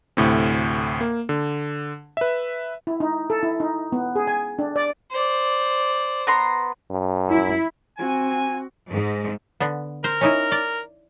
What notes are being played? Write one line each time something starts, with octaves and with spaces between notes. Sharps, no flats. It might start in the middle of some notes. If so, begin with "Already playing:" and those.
D2 A2 C3
A#3
D3
B4 E5
E4
D#4
A4
E4
D#4
B3
G#4
G#5
D4
D5
C5 D5
B3 A#5 C6
F#2
E4
C4 F#4 G#5
G#2
D3 B3
A#4 C5
C#4 D#4 E4
D5